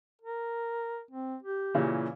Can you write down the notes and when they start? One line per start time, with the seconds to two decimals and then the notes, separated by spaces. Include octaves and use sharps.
0.22 A#4
1.11 C4
1.43 G4
1.74 A#2 C#3 E3